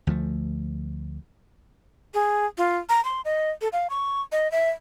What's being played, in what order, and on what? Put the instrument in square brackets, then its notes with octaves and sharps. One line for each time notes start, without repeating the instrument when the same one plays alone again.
[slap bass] D2 F3 A3
[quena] G#4
F4
A#5
C6
D#5
A4
F5
C#6
D#5
E5